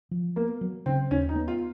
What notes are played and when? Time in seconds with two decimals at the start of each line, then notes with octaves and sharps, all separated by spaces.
0.11 F3
0.36 A#3 B3
0.61 F#3
0.86 C#3 C4
1.10 D#2 C#4
1.29 D#4
1.36 B3
1.48 F4